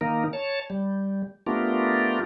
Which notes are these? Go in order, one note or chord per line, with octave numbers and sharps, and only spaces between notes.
D#3 A#3 D#4 A#4
C#5 A5
G3
A3 B3 D4 F4 G4 A#4